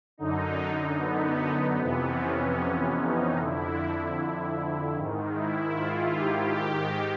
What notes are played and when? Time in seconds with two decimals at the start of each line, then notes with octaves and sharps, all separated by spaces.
0.18 F#2 D3 D#4
0.97 B3
1.77 F2 C3 E3 B3
2.17 C#4
2.97 D#4
3.36 F2 D3 E4
4.95 G#2 D#3
5.36 E4
5.75 F4
6.15 G4
6.55 G#2 D#3 G4